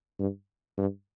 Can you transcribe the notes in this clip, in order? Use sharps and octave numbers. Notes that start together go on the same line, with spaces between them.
G2
G2